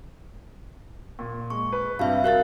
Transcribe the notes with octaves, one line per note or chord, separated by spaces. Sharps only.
A#2
G#3 C#6
B4
G2 C3 G3 E5 F5
F#4 A#4 F5 F#6 A6